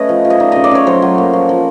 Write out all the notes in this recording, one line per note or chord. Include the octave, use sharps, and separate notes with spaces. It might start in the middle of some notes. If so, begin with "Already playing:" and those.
Already playing: A3 C#4 B4 D#5
F3
F3
D#5
D#4 D5
C#3 D#5
D5
C#3 C#5
F#3 C5
F#3
A#3
F3
F3